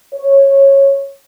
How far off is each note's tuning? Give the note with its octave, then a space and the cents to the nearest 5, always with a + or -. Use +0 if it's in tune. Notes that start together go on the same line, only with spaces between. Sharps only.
C#5 -15